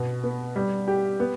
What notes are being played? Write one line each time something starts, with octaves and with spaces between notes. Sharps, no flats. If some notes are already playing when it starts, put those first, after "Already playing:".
Already playing: B2
B3
G3
G4
B3